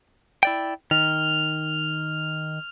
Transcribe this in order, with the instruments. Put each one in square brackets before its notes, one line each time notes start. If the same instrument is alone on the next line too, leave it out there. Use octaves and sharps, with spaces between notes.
[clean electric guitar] E4 D5 G5
[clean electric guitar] D#3 [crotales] F6 F7